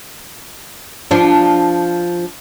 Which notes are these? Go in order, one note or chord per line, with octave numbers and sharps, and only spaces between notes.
F3 D4